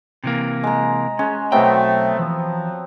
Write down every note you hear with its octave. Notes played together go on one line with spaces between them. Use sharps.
C3 E3 A#3
G#3 A#5
G#3 C#4
B1 F#3 A3 B3 C4 G5
E3 F3